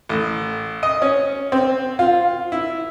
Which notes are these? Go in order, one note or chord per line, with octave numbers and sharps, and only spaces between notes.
A1
D#5
C#4
C4
F4
E4